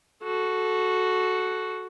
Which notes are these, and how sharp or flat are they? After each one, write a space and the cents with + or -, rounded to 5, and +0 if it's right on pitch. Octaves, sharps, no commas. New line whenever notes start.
F#4 +0 A4 -15